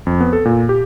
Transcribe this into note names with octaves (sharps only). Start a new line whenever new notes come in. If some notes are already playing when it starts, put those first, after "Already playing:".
F2
B3
A4
A#2
G4